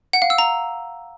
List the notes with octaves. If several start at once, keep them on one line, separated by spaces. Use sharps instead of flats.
F#5
F5
E6
A#5